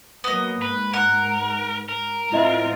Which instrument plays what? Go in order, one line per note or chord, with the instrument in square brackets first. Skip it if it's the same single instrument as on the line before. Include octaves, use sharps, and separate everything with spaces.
[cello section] F#3 A#3 [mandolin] B3 D#5
[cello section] G#2 [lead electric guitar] B4
[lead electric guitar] A#4 [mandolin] F#5
[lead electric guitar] A#4
[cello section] A2 C4 F4 [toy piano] E4 D#5 E5